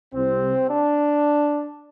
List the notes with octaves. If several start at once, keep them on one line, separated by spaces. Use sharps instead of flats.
C2 C3 C4
D4